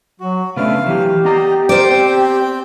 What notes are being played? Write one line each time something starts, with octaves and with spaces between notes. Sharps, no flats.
F#3 F#4
C#3 A3 B3 D4 F5
E3 F#3 G4
B3 D5 D#5 A#5
A#4 C5 D5
C4 G5